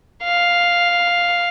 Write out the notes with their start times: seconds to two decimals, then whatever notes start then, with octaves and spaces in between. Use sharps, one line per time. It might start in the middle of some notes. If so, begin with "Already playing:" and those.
0.24 F5